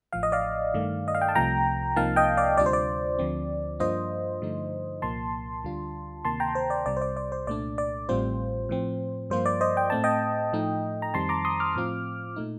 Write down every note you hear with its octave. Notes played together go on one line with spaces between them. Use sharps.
A1 A2 F3 F5
D#5
D5 F5
G2 D#3 A3
D#5
F5
G5
A5
C2 C3 F3 A3 G5 A#5
C2 C3 F3 A#3 D#4 F5 A5
D#5 G5
D5 F5
D2 C3 G3 D4 F4 D5
C5
D5
D2 D3 F3 C4
G2 F3 A#3 D4 F4 C5 D#5
G2 D3 F3 A3 D#4
C2 A#2 F3 A#3 A5 C6
D2 D3 G3 D4 F4
D2 C3 D#3 A#3 A5 C6
G5 A#5
C5
D5
C2 C3 G3 D5
C5
D5
D5
C5
C2 A#2 A3 D4 D5
D5
A1 A2 G3 C4 F4 C5
A2 F3 C4
G2 F3 A#3 F4 C5
D5
C5 D#5
G5
A2 A3 C4 A5
D#5 G5
A2 F3 A3 D#4
A#5
F2 D#3 G3 C4 A5 C6
A#5 D6
C6 D#6
D6 F6
A2 F3 C4 F4
A#2 A3 D#4